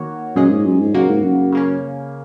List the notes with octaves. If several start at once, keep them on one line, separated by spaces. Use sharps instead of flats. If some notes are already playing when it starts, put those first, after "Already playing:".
Already playing: D#3 A#3 F#4 C#5
F#2 A#2 G#3 C#4 G#4 D#5
G#2
F#2
G#2
F#2 C#3 A#3 F#4
G#2
F#2
C#3 A#3 C#4